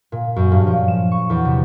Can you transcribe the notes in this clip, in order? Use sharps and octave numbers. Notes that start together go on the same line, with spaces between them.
A#2
F#2
G2
F3
E7
C#6
E2
C3